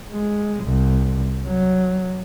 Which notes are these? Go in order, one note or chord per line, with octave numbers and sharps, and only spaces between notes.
G#3
C2
F#3